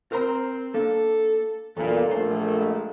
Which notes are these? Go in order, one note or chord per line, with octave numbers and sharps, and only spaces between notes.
C4 A#4 C5 A#5
A#3 D4 A4
B1 E2 G2 A#2 A4
A#1 A3 A#3 C5
G#3